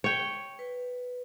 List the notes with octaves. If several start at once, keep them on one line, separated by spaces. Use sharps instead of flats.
C#5 G5
B4